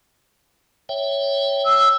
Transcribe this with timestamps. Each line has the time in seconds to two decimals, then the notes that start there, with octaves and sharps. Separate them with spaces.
0.89 C#5 E5 G5
1.65 E6